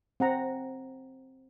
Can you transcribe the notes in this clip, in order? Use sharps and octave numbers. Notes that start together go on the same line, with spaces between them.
C4 F#5 A#5